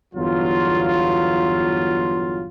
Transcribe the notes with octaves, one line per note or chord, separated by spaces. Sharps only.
G1 E2 F#3 F4